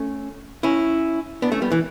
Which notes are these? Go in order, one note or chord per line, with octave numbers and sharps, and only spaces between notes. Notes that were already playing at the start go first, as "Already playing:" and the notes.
Already playing: A3 C#4
C#4 E4
B3 D4
A3 C#4
G3 B3
E3